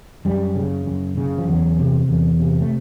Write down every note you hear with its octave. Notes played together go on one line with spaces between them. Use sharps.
F#2 G3
C#3
F#2
C#3
F3
E2 F#3
C3
E2
C3
A3